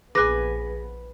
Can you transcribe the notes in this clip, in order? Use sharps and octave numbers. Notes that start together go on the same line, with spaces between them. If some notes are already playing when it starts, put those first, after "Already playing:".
A#1 B3 G#4 B4 G#5 D6 F#6 A#6